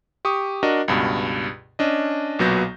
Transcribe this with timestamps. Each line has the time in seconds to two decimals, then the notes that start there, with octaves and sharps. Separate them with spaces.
0.25 G4 C#6 D#6
0.63 D4 F#4 A#4 D#5
0.88 C#2 G2 B2
1.79 C#4 D4 D#5
2.39 B1 A#2 F#3 B3 G6 A#6